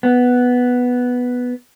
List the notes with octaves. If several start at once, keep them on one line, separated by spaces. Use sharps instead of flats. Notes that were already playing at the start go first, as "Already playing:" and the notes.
B3